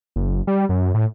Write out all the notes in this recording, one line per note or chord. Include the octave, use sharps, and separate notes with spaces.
F#1
G3
F#2
A2